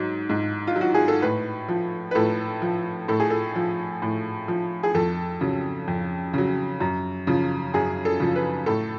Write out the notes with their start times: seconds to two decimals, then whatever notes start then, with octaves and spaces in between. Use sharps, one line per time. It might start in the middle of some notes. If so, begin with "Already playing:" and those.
Already playing: G#2 F#3
0.29 G#2
0.67 F4
0.76 F#3
0.81 F#4
0.94 G#4
1.08 A4
1.22 A2 B4
1.68 F3
2.11 B4
2.15 A2 A4
2.62 F3
3.08 A2 A4
3.20 G#4
3.30 A4
3.55 F3
4.02 A2
4.48 F3
4.83 G#4
4.94 F2 A4
5.41 C#3 F#3
5.88 F2
6.34 C#3 F#3
6.80 F#2
7.27 C#3 F3
7.74 F#2 G#4
8.05 A4
8.20 C#3 F3
8.36 B4
8.66 A2 A4